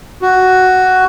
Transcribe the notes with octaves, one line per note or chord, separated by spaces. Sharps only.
F#4